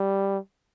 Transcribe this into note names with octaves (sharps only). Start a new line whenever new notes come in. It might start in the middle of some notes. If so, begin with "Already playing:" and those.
Already playing: G3